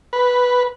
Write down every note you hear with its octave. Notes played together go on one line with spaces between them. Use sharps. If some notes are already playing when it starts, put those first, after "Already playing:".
B4